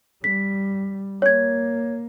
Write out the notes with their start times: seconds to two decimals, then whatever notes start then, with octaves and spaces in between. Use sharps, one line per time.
0.24 G3 B6
1.22 A#3 C#5 G#6